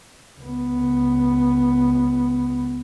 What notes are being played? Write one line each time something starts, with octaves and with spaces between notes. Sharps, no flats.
C#2 B3